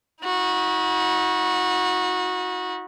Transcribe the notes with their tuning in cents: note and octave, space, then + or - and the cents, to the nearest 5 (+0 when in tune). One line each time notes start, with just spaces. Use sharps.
D#4 +45 F#4 -20